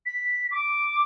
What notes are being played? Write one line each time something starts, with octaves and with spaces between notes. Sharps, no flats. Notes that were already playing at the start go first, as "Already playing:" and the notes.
B6
D6